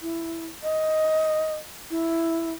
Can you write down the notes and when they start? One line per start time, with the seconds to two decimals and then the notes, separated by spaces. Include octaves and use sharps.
0.02 E4
0.63 D#5
1.91 E4